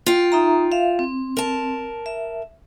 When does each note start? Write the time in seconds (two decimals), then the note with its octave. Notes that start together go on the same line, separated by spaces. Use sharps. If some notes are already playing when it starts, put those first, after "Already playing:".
0.06 F4 G5
0.32 D#4 E5 A#5
0.72 E5 F5
0.99 C4
1.37 A#4 A5
2.06 E5